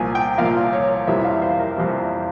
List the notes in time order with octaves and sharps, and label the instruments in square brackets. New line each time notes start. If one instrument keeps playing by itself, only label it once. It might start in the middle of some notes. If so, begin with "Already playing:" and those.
Already playing: [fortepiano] C2 A#2 F3 A#3 G#5
G5
C2 A#2 F3 A#3 F5
C#5
F2 C3 E3 G3 A#3 E5
F5
C5
A#4
F2 C3 E3 G3 A#3